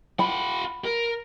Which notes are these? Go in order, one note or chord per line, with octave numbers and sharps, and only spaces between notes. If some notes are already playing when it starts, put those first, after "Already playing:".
F4 F#5 B5
A#4